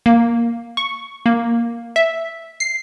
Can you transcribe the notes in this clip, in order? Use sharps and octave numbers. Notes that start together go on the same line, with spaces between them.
A#3
C#6
A#3
E5
C7